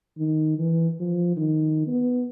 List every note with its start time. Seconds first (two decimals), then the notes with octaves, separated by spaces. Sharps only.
0.18 D#3
0.58 E3
1.00 F3
1.37 D#3
1.87 B3